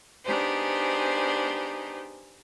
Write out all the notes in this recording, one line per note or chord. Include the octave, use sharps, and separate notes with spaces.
B3 D4 D#4 G4 G#4 C5